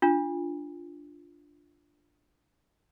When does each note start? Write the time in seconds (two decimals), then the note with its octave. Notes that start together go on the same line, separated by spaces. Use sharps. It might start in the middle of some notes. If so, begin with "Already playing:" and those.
0.02 D4 F4